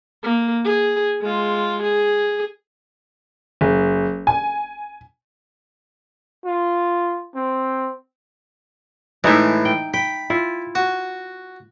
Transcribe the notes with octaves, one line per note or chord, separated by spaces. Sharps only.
A#3
G#4
G#3 F4
G#4
F#1
G#5
F4
C4
A2 E3 G#3 D#4 E5
G5
G5 B5
E4 F4
F#4